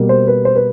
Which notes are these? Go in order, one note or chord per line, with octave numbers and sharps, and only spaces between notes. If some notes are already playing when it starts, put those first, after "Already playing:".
Already playing: B2 G3 A#3
C5
B4
C5
B4